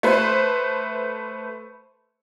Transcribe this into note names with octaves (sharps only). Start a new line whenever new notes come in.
A3 B4 C5